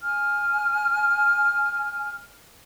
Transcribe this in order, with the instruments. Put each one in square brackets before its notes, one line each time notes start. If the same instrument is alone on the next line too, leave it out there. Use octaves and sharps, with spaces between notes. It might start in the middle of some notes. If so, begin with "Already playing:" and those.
[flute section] G#5 F6